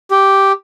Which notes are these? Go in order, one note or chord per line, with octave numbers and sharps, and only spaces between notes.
G4